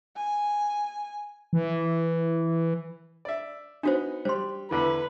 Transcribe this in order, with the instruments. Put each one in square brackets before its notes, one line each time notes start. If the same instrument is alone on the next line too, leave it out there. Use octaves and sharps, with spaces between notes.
[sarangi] G#5
[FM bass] E3
[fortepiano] D5 E5
[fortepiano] B3 D#4 [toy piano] D4 F#4 C5
[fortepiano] G3 [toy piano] C5 C6
[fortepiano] E2 D3 E3 [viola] B4